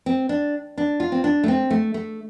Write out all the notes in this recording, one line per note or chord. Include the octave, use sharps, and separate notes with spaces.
C4
D4
D4
F4
C4
D4
A3
C4
A3
A3